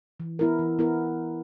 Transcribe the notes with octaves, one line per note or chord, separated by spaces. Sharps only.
E3
B3 E4 A#4
E3
B3 E4 A#4